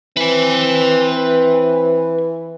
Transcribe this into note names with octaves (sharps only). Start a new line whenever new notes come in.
E3 C4 B4 G#5